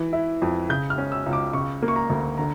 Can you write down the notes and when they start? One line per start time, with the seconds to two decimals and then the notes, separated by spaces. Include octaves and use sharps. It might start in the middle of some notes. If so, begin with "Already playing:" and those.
Already playing: E3
0.13 E4
0.42 F2
0.69 C#3 G6
0.90 F6
0.98 C#4
1.12 E6
1.26 C#2
1.33 D6
1.53 C#3 C#6
1.82 A#3
1.88 C#6
1.96 A#5
2.10 D2
2.38 D3 A#5